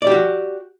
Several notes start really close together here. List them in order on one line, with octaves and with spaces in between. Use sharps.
D5 G4 F#4